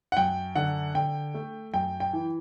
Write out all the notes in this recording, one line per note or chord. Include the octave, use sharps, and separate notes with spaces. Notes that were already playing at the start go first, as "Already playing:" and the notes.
F#5
F#2 G5
D3 F#5
D3 G5
A3
F#2 G5
G5
E3